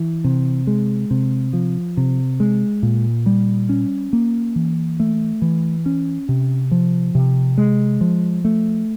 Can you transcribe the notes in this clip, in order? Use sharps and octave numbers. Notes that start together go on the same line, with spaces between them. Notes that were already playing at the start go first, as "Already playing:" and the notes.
Already playing: E3
C3
G#3
C3
F3
C3
G#3
A#2
G3
C#4
A#3
E3
A3
E3
C#4
C3
F3
C3
G#3
F3
A3